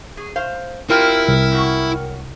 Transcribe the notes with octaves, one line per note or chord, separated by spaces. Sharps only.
G#4
C5 F5
C4 E4 F4 G4 A#4 G5 F6
C2
F#2 F#4